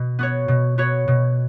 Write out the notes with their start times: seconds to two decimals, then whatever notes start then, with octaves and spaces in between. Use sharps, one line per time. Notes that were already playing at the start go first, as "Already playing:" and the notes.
Already playing: B2
0.19 B3 F#4 C#5
0.48 B2
0.78 B3 F#4 C#5
1.08 B2